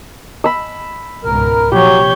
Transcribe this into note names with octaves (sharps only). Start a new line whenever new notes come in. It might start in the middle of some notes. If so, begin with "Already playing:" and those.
B5 E6
C#2 G#2 B2 A#4
A#1 C3 F3 F#3 G4 C#5 G6